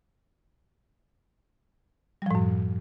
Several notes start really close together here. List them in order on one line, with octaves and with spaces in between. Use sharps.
G3 F3 A2 F#2